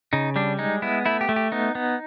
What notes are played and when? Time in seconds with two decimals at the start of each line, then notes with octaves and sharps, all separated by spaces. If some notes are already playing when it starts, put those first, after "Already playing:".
0.13 C#3 D#4
0.36 G3 D4
0.59 G#3 D#4
0.82 B3 E4
1.06 A3 E4
1.21 G4
1.29 A3
1.36 G4
1.52 B3 D#4
1.75 B3